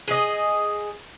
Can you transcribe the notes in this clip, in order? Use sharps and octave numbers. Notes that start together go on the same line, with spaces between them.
G#4 D#5